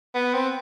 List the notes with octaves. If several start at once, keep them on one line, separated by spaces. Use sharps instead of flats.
B3
C4